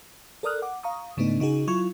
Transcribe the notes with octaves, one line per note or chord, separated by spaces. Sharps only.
A4 A#4 D5 D#6 F6 F#6
F#5 D6
F5 A#5 C#6 D#6
G#2 C#3 A3 B3 D4 D#4
C#3 D#4 F#4 G#4
F#3 E4 F4 C#6 G#6